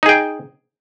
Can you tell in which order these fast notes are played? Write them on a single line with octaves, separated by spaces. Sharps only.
D#4 G#4 G5